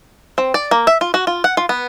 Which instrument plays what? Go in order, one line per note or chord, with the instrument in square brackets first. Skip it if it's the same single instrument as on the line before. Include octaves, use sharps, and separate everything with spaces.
[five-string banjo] C4
D5
A#3
E5
F4
F#4
F4
F#5
F4
B3